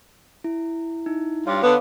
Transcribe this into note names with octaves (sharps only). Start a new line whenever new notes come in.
E4
D#4 E4
G2 F4 C#5 F5 D6
D3 B3